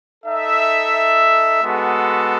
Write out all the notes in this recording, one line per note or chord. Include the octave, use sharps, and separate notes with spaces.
D#4 A4 E5
G#3 B3 F#4 A4